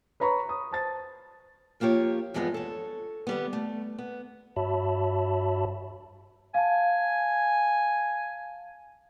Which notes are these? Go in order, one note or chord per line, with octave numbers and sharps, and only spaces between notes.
B4 C#5 A#5 B5 C#6
D#6
C5 A5 A6
F3 A#3 F4 G4 C#5
E2 G2 F3 G#3 B3 D#4
A4 C#5
D#3 G3 B3
A3
B3
G2 F#4 C#5 E5 A5 B5
F5 G#5 A5